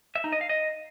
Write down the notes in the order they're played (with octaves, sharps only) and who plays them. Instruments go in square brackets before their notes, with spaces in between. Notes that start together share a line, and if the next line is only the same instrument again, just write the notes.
[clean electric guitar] E5
D#4
D#5
F5
D#5